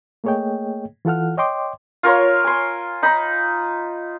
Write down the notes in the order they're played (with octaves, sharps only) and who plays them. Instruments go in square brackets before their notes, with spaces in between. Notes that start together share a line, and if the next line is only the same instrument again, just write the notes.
[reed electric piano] A3 A#3 G#4 C#5 D#5 G5
E3 F4 A4 F#5 F6
C#5 D#5 G5 C6 D6
[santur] F4 A#4 C#5 C6
G#5 C6
D#4 B5